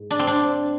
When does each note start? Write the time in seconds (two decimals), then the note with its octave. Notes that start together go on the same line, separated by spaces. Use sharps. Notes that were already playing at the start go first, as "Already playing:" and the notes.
Already playing: G#2
0.11 D4
0.19 C4
0.27 D4